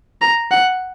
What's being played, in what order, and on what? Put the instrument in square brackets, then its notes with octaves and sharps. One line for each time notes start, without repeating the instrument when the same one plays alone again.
[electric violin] A#5
F#5